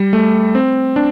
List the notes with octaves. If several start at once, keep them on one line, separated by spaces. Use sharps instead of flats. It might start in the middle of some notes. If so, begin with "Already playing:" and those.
Already playing: G3
A3
C4
D4